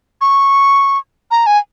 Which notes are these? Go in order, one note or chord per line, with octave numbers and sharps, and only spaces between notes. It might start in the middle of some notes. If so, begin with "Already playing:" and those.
C#6
A#5
G#5